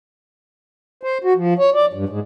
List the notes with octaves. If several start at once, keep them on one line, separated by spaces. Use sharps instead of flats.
C5
F#4
F3
C#5
D5
G2
G#2